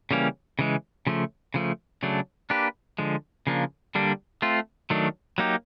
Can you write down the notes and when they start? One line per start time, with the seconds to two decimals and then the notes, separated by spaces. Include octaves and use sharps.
0.11 C#3 E3 G3 A#3 C#4
0.59 C#3 E3 G#3
1.07 C#3 F3 A3
1.54 C#3 F3 A3
2.03 C#3 F#3 A3 D4
2.50 A#3 D4 G4 B4
2.99 D3 F3 G#3
3.47 C#3 F3 A#3 D4
3.95 D3 G3 A#3 D4
4.42 A3 C4 F4
4.90 D#3 F#3 A3 D4
5.38 F#3 A#3 D#4 G4